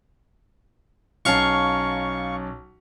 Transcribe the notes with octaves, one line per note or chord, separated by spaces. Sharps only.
B1 C#4 F5 A5 C#6